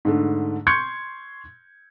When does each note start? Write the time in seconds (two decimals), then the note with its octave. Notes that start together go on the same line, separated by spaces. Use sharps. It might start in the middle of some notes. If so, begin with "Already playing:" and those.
0.05 G#2 D3 A3
0.67 C6 C#6 G6 G#6 C#7